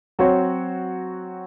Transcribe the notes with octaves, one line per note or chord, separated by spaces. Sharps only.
F#3 C4 F#4 C#5